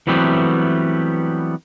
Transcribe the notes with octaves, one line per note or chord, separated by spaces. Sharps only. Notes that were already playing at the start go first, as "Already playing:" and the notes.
E3 F#3 G3 A3 B3 C4